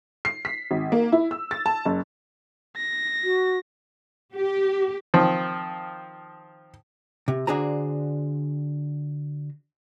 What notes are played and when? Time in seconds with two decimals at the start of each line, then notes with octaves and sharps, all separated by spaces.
0.25 C7
0.45 B6
0.71 G#1
0.92 A#3
1.12 E4
1.31 E6
1.51 A6
1.66 A5
1.85 F#1
2.77 A#6
3.24 F#4
4.35 G4
5.14 D#3 F3 C4
7.28 C3
7.47 D3 D4 F#4 G#4 C5 A#5